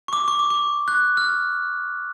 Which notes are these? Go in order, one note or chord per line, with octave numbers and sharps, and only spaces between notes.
C#6
D6
C#6
D6
C#6
F#6
F6